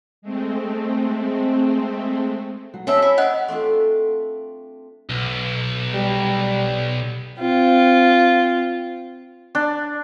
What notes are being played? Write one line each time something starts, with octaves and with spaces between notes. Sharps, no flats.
G#3 A3 C4
F#3
C4 C#4 A4 E5
E4
D#5 F#5 G5 F#6
A3 C4 D4 F4
B1
G3
C4 F4
D4